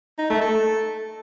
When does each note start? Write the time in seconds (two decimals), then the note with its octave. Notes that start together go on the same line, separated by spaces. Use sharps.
0.18 D#4
0.30 A3
0.42 A4